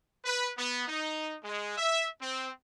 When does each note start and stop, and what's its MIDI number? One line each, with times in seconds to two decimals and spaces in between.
0.25 0.49 71
0.58 0.86 59
0.88 1.36 63
1.44 1.76 56
1.77 2.07 76
2.22 2.48 60